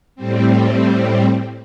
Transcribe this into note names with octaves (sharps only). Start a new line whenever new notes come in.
A2 G3 C4